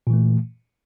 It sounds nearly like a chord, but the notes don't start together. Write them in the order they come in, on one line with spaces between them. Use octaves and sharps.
A#2 E3 A3